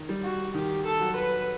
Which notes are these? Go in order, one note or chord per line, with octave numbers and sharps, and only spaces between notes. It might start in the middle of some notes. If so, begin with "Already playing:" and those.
Already playing: D#3
G3
F#4
D#3 G4
A4
F#3
B4